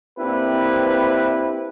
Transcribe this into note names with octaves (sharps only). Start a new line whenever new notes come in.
A#3 C4 D4 E4 G4 B4